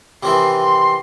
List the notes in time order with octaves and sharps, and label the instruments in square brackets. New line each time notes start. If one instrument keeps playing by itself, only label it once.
[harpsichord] C3 D#3 E3 [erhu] C6
[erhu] C6